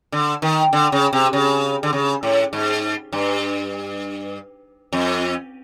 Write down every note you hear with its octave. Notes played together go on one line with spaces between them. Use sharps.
D3
D#3
D3
C#3
C3
C#3
D3
C#3
A2
G#2
G2
F2